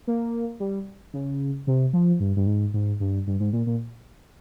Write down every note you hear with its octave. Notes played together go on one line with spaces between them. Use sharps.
A#3
G3
C#3
C3
F3
G2
G2
G#2
G#2
G2
G2
G#2
A#2
A#2